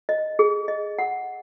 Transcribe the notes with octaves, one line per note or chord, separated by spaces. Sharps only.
D#5
G#4
D#5
F#5